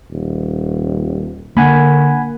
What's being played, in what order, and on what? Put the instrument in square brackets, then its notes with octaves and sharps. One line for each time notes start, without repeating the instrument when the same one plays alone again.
[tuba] D#1
[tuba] D3 [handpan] A#3 [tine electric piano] F#5 G#5 B5